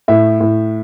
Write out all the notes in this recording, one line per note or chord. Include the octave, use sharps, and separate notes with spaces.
A2 E5
A2